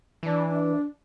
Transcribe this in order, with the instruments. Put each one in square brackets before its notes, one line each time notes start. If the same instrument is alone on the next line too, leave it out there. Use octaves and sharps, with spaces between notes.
[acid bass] E3 [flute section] D4
[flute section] D4